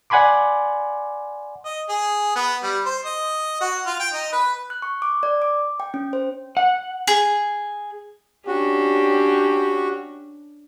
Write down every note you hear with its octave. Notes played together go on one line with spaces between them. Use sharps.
D5 F#5 G#5 B5 C6 D6
D#5
G#4
B3
G3
C5
D#5
F#4
F4
G5
D#4
B4
F#6
C#6
D6
D5
D6
G5
C#4
C5
F#5
G#4
C#4 D4 F#4 G4